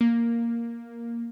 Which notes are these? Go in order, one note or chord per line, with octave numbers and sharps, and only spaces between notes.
A#3